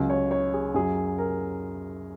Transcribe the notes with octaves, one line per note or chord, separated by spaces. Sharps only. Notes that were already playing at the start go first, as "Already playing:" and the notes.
Already playing: C#2 C#3 F#3
C#5
C#5
G#4
F#2 F#3 G#4
A#4